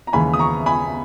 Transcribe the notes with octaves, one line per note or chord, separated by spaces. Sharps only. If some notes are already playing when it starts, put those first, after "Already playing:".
A#5
D#2 C#3 E3 G#3 G#5 B5
D#6
A#5 C#6
G#5 B5